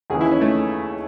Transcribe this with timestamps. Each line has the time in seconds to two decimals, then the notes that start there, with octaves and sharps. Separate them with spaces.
0.10 D#2 C#3 E3 G#4
0.21 E4
0.31 C#4
0.41 A3